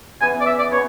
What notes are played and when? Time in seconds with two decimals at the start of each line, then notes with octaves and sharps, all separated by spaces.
0.20 C#3 E3 B3 G#5
0.40 D5
0.46 E5
0.59 D5
0.71 C#3 E3 B3 C#5